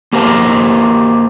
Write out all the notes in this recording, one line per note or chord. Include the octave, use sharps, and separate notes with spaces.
A#3 G4 A#4 C5 G#5 A5